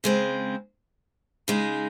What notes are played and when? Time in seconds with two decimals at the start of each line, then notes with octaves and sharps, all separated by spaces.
0.04 C#3 G#3 C4
1.48 C#3 G#3 D#4